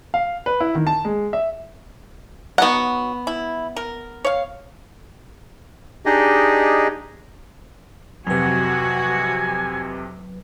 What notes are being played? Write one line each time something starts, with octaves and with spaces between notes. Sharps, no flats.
F5
B4
E4
D#3
A5
G#3
E5
F#3 B3 D#4 F#4 F#5
E4
A#4
C#5 F5
D4 D#4 G4 G#4 D#5
F2 C3 F#3 F#4 B4 G#5